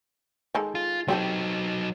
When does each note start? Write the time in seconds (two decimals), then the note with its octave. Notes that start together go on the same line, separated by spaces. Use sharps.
0.55 D#3 G#3 A4
0.75 F4
1.08 F#3 C4 D#4 G4 A4